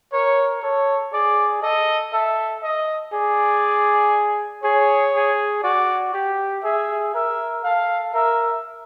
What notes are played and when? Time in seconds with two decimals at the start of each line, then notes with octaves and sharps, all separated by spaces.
0.13 A#4 C#5
0.62 A4 C#5
1.13 G#4 D5
1.62 A4 D#5
2.13 A4 E5
2.63 D#5
3.13 G#4 D5
4.63 G#4 C#5
5.14 G#4
5.63 F#4 D5
6.13 G4
6.64 G#4 E5
7.14 A#4 E5
7.64 A4 F5
8.14 A#4 E5